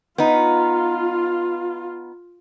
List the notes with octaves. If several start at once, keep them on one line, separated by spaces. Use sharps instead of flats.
B3 D#4 F4